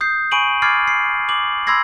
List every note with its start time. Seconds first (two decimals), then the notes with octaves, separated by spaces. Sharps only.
0.01 D#6 G6 C7
0.32 G#5 B5 C#6 D7 D#7 F#7
0.62 B5 D6 F6 G#6 A6 C7
0.88 C7
1.29 D6 F#7
1.67 B5 C6 E6 G#6 A#6 C7